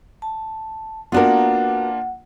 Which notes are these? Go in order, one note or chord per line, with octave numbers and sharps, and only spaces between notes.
A5
A#3 B3 D4 F4 F#4 A#4 F#5